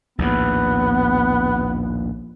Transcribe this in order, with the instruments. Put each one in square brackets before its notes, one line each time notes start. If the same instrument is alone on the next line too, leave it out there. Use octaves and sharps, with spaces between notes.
[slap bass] A#1 D#2 A2 [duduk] B3